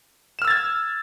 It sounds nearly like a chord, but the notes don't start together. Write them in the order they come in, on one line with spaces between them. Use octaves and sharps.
E7 F6 E6 A6 G#6